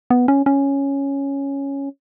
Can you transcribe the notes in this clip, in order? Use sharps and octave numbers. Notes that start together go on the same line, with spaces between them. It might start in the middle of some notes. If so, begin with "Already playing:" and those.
B3
C#4
C#4